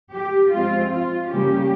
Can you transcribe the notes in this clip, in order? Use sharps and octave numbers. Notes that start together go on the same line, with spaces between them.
G4
F3 G#3 C4 F4
F4
C#3 G3 A#3 C#4 G4